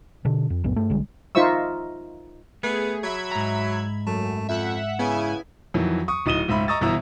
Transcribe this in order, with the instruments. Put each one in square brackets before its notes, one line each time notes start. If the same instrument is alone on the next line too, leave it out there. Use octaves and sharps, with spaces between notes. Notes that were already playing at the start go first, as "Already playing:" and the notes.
[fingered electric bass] B2 D3
F2
B1 F2 A2 B3
G2 A3
B1 D3 G3 G#3
[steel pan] D#4 F4 C5 E5 C#6 E6
[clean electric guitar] A3 [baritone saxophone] B3 [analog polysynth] G#4
[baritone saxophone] F#3 [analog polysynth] E5 B5 G#6
[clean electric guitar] G#2 A#5
[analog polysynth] F#2 [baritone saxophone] A3
[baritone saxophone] F2 [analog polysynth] E5 F#5
[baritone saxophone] C#3 [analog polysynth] B3 E4 G#5
[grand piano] F2 D#3 E3 F#3
C#6 D#6
D1 D#4 D#6 D#7 E7 G7
C#2 G#2 E5 B5
D#5 A#5 C#6 D#6 E6 A6
G1 B2 E3 E5 A#5 E6